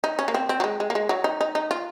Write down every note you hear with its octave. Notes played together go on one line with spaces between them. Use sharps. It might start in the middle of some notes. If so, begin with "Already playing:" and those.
D#4
C#4
A#3
C4
C4
F#3
G#3
G#3
A#3
G#3
F#3
D#4
D#4
D#4
F4